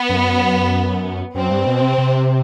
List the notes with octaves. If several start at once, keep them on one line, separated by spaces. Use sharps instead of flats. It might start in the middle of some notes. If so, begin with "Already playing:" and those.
Already playing: B3
F#2
F#2 C4
G2
B2
C3
C3